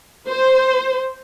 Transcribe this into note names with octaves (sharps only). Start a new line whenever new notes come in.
C5